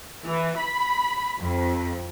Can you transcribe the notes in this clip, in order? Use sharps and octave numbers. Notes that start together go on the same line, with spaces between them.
E3
B5
F2